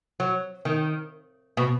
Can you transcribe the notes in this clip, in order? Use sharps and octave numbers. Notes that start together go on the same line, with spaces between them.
F#3
D#3
B2